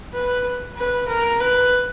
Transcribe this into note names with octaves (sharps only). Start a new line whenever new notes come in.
B4
B4
A#4
B4